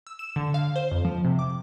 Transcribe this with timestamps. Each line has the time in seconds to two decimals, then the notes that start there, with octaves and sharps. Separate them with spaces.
0.07 E6
0.19 E7
0.36 D3
0.54 F5
0.76 C5
0.92 F2
1.05 F3
1.25 C3
1.39 D6